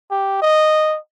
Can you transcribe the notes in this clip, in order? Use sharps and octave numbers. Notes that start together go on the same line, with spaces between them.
G4
D#5